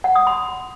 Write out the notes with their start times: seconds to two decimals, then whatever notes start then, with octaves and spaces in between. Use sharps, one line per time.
0.04 F#5
0.15 D#6
0.27 C6